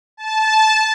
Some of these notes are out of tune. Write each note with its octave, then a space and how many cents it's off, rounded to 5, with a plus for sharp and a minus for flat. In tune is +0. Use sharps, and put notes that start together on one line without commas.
A5 -15